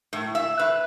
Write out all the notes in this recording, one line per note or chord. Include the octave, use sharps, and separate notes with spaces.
A2
E5
B4